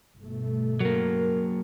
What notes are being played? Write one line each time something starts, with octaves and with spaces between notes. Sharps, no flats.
G1 B2 A3
F#3 A#3 A#4